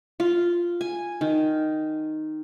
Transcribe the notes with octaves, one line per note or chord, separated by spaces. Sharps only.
F4
G#5
D#3